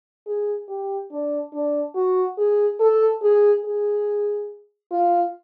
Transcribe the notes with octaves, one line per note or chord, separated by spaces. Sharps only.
G#4
G4
D4
D4
F#4
G#4
A4
G#4
G#4
F4